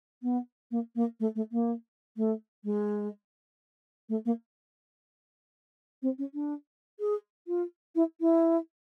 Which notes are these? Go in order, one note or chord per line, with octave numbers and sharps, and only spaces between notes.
B3
A#3
A#3
A3
A3
A#3
A3
G#3
A3
A#3
C4
C#4
D4
G#4
F4
E4
E4